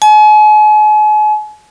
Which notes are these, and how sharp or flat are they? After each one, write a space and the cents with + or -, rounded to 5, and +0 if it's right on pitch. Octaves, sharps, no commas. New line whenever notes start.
G#5 +40